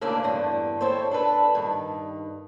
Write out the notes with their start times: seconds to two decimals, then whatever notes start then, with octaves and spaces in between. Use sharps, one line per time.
0.01 D2 C#3 A#3 D4 E4 E5
0.23 E2 G2 D3
0.81 C4 E4 A4 C5 C#5
1.11 D4 A4 B4
1.55 G2 D#3